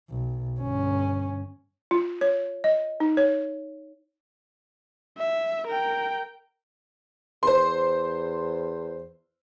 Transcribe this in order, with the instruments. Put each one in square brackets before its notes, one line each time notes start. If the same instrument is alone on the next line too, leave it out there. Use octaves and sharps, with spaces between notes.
[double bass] B1
G1 C#4
[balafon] F4
C#5
D#5
D#4
C#5
[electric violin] E5
A#4 G5
[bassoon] E2 [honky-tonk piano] C5 C6